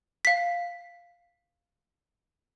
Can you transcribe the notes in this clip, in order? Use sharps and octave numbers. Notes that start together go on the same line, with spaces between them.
F5 B6